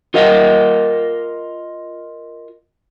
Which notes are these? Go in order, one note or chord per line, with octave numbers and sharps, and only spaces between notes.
F4 A#4 D#5 F5